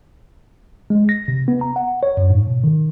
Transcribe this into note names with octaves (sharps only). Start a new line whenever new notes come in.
G#3
A#6
C3
B3
A#5
F#5
C#5
F#2
G#2
B2
D#3